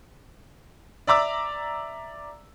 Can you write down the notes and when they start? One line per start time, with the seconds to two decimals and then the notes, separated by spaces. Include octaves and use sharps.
1.07 D5 E5 A#5 D6 E6